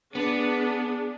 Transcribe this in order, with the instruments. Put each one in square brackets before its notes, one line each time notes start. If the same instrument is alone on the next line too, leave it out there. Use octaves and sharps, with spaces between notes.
[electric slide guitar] B3 [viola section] D4 G#4